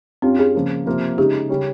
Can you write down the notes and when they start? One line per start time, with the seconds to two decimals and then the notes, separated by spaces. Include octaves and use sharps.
0.22 G2 G3 C4 C#4 F4
0.39 G#4
0.55 C#3 F3 A#3
0.86 C3 F3 A#3 F4
1.17 C#3 G#3 D#4 G4
1.49 C#3 G3 C#4